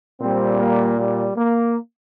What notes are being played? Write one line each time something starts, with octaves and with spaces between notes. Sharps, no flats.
A#2 G3 C4
A#3
G3
A#3